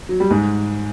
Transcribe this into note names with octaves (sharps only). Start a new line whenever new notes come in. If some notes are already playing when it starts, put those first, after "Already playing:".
F#3
G3
G#2 G#3